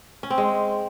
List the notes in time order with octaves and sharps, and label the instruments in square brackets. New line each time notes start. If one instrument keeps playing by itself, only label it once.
[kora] C#4
C4
G#3